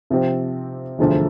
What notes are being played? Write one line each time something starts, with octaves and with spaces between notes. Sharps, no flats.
C3 F3 C4 G4
E1 D2 D3 F3 A3